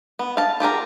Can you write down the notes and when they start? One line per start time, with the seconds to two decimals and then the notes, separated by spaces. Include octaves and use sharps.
0.19 B3
0.37 F5 A5
0.60 F4 G4 G#4 A#4